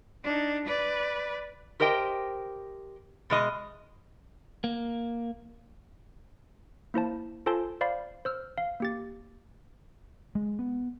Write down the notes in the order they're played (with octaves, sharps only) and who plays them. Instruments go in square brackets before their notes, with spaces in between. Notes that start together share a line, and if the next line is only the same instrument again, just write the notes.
[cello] D4 D#4
B4 D5
[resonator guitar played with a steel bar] G4 A#4 C5 D#5 G5
B2 G#3 D#5
[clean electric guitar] A#3
[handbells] A#3 E4 C5 A5
F4 A4 C5 G#5 A5 C6
C5 D5 F5 B5
C5 E6 F6
F5
A#3 G4 A6
[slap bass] G#3
B3